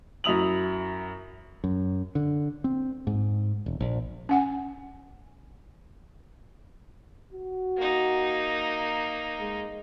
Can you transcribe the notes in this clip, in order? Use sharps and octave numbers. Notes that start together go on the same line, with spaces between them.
F#2 F#3 E4 D#6 F7 F#7
F#2
D3
C4
G#2
E1
A#1
C#4 F#5 G#5
F#4
A#3 D#4
G#3